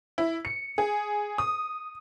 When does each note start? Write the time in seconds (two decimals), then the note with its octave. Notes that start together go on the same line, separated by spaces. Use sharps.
0.18 E4
0.45 C#7
0.78 G#4
1.38 D#6